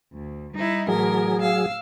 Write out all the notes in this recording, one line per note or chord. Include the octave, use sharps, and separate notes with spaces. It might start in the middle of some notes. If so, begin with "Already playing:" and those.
D2
G3 D#4 E4
A2 E3 F#3 G#4 A#4
F5 E6